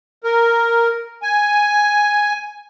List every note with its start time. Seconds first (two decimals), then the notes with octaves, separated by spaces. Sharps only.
0.24 A#4
1.23 G#5